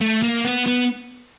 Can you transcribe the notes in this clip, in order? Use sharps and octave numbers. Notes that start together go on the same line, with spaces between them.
A3
A#3
B3
B3